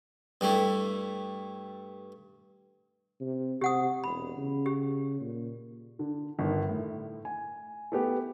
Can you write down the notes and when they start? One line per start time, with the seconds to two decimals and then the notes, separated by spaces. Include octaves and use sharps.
0.41 G2 G3 A3 E4
3.21 C3
3.61 C3 G4 F#5 D#6
4.04 E1 B5
4.37 C#3
4.66 G4
5.21 A#2
5.99 D3
6.39 G1 D#3
6.69 A2
7.25 G#5
7.92 A3 B3 G4